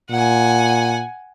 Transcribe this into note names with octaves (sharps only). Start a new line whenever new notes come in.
A#2 F#5 G#5